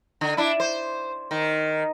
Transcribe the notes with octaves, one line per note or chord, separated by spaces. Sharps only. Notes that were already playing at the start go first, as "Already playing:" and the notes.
D3
D4 E4
C5
D#3